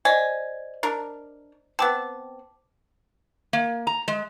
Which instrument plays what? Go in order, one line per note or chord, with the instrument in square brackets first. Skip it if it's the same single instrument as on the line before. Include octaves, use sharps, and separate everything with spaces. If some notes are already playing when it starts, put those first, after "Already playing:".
[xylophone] C5 D5 D#5 [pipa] G#5
[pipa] D4 A#4
[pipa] B3 C4 [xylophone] A5 D6
[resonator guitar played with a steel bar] A#3
A#5
G#3